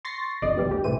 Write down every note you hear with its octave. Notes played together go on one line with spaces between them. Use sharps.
C6 C#6 A6 A#6 C7
G1 F2 D5 D#5
D#2 B2 F3 G3
D2 G4
C2 A2 E3 C5 D#7